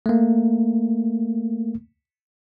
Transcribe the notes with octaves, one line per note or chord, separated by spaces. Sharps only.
A3 A#3